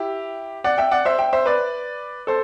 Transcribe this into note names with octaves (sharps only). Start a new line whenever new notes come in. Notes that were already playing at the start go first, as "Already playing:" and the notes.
Already playing: E4 G4
D5 F#5
E5 G5
D5 F#5
C5 E5
E5 G5
C5 E5
B4 D5
A4 C5